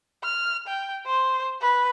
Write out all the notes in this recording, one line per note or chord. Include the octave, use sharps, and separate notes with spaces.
F6
G5
C5
B4